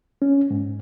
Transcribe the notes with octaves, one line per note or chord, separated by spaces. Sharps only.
C#4
G#2